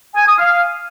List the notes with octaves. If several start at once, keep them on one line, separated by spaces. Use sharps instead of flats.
G#5
D#6
F5